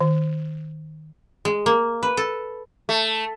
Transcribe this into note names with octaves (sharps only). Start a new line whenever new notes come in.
D#3
G#3
A#3
B4
A4
A3